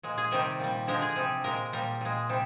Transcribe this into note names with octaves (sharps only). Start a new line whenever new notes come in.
A#2 G#3
G#4
C3 D#3 G3 A#4
A#2 G3
D3 F3 G#3 A#4
G#4
C3 G3
A#2 G#3 A#4
A#2 G3 A#4
A#2 G#3
C3 G3